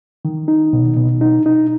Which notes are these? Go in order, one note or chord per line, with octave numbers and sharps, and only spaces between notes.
D#3
D#4
B2
B2
D#4
D#4